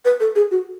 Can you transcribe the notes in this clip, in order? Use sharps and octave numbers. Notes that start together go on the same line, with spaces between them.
B4
A4
G#4
F#4